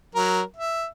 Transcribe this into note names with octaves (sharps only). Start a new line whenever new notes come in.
F#3 A#4
E5